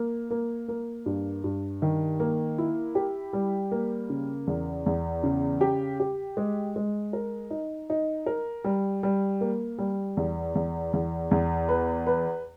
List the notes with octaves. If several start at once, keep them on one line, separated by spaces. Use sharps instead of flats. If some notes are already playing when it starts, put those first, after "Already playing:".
Already playing: A#3
A#3
A#3
G2
G2
D#3
A#3
E4
G4
G3
A#3
C#3
E2
E2
C#3
G4
G4
G#3
G#3
A#4
D#4
D#4
A#4
G3
G3
A#3
G3
E2
E2
E2
E2
B4
B4